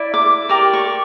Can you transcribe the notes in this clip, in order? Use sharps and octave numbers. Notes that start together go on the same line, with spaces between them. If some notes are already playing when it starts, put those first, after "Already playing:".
Already playing: E4 D5
D6
G4 A#4 D5 D6
C#6